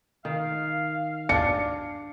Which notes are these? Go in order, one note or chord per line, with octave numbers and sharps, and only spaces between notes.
D#3 F5
D4 C#7